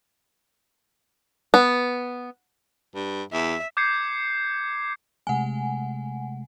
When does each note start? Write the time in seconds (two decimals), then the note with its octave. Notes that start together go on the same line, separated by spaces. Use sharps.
1.54 B3
2.95 G2
3.33 E2 E5
3.77 D6 G6 G#6 C7 C#7
5.27 C3 G#3 A3 F#5 G#5